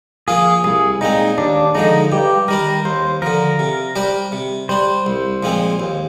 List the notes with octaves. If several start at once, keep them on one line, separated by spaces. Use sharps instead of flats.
F3 A#3 F4 G#4
C2 G#4
A#2 G#3 C4 D#4
D#2 D4
D3 F3 G#3 D#4
G2 G4
D#3 G3 D4 A#4
D#2 C5
D3 F3 A#4
C3
G3 D4 G4 C5
C3
G3 D4 C5
C2
A#2 F3 G#3 C4
D#2